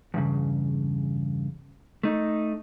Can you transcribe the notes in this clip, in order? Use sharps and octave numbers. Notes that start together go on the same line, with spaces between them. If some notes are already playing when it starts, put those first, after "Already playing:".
E2 G2 C#3
A3 D#4